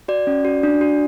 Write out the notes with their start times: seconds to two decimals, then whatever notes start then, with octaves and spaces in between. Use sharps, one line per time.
0.08 F#4 D5
0.27 C#4
0.45 F#4
0.63 D4
0.81 F#4